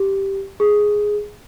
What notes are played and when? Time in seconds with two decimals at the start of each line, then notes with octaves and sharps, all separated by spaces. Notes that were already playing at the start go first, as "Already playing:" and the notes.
Already playing: G4
0.60 G#4